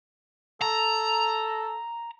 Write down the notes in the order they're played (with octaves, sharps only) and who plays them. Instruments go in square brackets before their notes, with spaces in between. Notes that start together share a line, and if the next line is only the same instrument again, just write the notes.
[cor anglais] A4 [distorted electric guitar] A#5